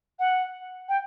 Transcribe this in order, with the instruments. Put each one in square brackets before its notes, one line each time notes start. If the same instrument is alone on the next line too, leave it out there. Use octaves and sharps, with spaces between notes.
[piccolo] F#5
G5